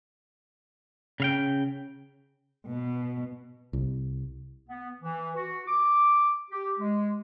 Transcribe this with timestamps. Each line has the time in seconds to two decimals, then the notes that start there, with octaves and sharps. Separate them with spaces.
1.20 C#3 F5 G5
2.68 B2
3.73 C2
4.69 B3
5.01 E3
5.35 F#4
5.67 D6
6.51 G4
6.79 G#3